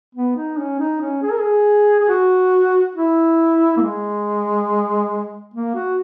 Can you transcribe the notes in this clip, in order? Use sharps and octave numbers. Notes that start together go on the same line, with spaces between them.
B3
D#4
C#4
D#4
C#4
G#4
A#4
G#4
G#4
F#4
E4
A#3
G#3
A#3
F#4